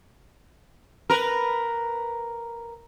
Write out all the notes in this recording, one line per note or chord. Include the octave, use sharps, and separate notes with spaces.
A#4 B4